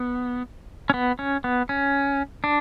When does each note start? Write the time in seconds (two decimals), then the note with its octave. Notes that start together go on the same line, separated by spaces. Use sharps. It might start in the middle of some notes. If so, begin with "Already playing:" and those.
Already playing: B3
0.90 C#4
0.94 B3
1.19 C#4
1.44 B3
1.69 C#4
2.44 D4